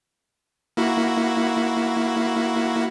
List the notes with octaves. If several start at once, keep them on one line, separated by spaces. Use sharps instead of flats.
A#3 E4 F#4